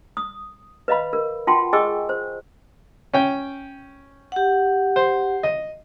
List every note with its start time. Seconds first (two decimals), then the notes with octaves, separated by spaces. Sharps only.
0.17 D#6
0.88 B4 D#5 F5 B5
1.13 A#4
1.47 F4 F#4 F#5 G5 A5 C6
1.73 G#4 D#5 G5 G#5 C#6 E6
2.09 C5
3.14 C#4 G5
4.32 G4 F#5
4.96 C5
5.43 D#5